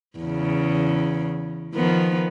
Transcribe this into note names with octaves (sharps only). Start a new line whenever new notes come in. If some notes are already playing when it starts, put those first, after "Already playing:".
E2 C#3
D#3 F3 B3